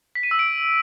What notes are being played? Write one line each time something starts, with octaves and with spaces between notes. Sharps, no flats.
B6
D#7
E6
D7